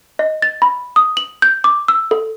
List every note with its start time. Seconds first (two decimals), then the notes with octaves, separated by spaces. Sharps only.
0.19 D#5
0.42 A6
0.62 B5
0.96 D#6
1.17 F#7
1.42 G6
1.64 D6
1.88 E6
2.11 A4